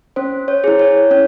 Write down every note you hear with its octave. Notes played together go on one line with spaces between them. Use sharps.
C#4 C5
C#5
E4 G#4
C#5
C#4 C#5